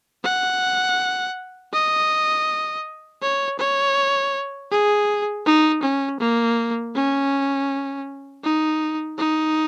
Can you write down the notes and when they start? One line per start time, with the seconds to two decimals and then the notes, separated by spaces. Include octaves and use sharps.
0.24 F#5
1.73 D#5
3.22 C#5
3.59 C#5
4.71 G#4
5.46 D#4
5.83 C#4
6.20 A#3
6.95 C#4
8.44 D#4
9.18 D#4